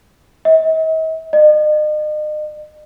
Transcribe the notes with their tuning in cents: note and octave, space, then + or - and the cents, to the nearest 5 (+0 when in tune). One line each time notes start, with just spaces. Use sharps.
D#5 +45
D#5 -40